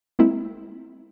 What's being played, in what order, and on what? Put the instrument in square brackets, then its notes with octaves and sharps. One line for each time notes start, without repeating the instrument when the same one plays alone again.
[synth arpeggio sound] G#3 A#3 C4 E4